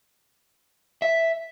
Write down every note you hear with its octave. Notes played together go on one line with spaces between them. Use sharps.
E5